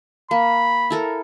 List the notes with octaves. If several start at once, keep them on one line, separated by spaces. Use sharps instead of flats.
A#3 B5
E4 A4 A#4